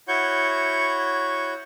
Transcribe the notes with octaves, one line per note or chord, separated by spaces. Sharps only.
E4 F#4 C#5 F#5 C#6 G6